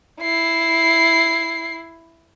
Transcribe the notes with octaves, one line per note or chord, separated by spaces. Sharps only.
E4 C7